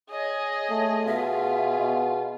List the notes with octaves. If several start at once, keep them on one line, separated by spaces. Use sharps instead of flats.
G#4 C#5 D#5
A3
B2 F4 G#4 E5
B2